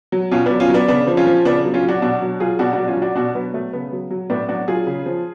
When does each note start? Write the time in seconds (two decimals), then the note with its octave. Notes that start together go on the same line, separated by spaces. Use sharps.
0.12 F#3
0.31 B2 C#4 F4
0.46 F#3 B3 D4
0.60 C#4 F4
0.69 F#3 B3 D4
0.88 C#3 B3 D4
1.07 F3
1.17 C#4 F4
1.27 F3
1.45 C#3 B3 D4
1.64 F#3
1.74 C#4 F4
1.83 F#3
1.88 D4 F#4
2.02 B2 D4 F#4
2.22 F#3
2.40 F#3 F4 G#4
2.59 B2 D4 F#4
2.73 D4 F#4
2.78 F#3
2.88 C#4 F4
2.97 F#3 D4 F#4
3.16 B2 D4 F#4
3.35 F#3 B3
3.54 F#3 A3
3.73 C#3 B3
3.92 F#3
4.11 F#3
4.30 A2 B3 D4
4.49 F#3 D4 F#4
4.68 F#3 F4 G#4
4.87 C#3
5.06 F3